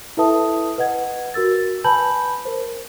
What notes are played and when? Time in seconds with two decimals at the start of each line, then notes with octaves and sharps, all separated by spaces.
0.17 E4 A4 B4 E5 A5 D#6
0.78 B4 D#5 F#5 G#6
1.34 F#4 A#4 E6 A6
1.84 B4 G#5 A5 B5 G6 F#7
2.45 A#4 C5